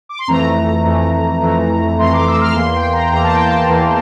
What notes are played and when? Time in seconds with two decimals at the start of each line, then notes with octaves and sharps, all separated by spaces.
0.09 D6
0.19 C6
0.28 F2 E3 A3 A#5
0.85 F2 E3 A3
1.42 F2 E3 A3
1.99 F2 E3 A3 C6
2.13 D6
2.27 E6
2.41 F6
2.55 E2 E3 A#3 C6
2.74 G5
2.93 A#5
3.12 E2 E3 A#3 A#5
3.23 A5
3.34 G5
3.45 A5
3.69 E2 E3 A#3